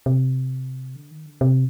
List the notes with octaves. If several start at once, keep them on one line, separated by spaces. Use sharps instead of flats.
C3
D3
D#3
D3
C3